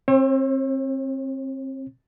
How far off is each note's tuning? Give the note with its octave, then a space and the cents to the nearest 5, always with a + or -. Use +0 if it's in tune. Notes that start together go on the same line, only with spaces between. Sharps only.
C4 +30 C#5 -40